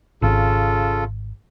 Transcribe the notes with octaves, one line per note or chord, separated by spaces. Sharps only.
G#1 C#3 F4 A4